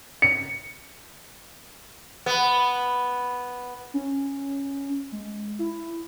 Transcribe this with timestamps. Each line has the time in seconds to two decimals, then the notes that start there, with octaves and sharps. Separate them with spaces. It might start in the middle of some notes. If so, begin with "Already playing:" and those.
0.22 C#7
2.26 B3
3.94 C#4
5.12 G#3
5.59 E4